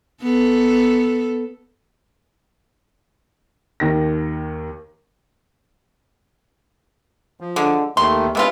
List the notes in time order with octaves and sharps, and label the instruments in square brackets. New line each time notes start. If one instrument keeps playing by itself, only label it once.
[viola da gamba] B3 A4
[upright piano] D#2 D#3 A#6
[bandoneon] F3
[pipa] D3 G#3
[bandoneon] D#2 D#3 A3 [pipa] C6
[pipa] C3 B3 F4 [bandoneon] G#3